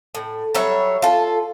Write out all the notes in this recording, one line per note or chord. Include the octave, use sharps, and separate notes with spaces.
A2
F#3 G3 C#5 E5
F4 A4